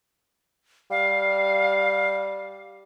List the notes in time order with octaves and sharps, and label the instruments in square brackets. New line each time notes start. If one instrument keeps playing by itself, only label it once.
[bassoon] G3 [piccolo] F5